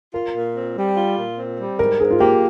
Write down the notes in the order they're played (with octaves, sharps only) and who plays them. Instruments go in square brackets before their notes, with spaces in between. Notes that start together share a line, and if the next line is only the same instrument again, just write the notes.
[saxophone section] F4 [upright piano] A#4
[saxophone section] A#2
C4
G3
F4
A#2
C4
G3
[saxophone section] G#2 [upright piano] A#4
[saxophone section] G#2 [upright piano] G#4
[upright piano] F4
[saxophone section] A#3 [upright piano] G4